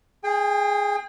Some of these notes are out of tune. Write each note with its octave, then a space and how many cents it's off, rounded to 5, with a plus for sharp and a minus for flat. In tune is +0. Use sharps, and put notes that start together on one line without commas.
G#4 +0 G5 +40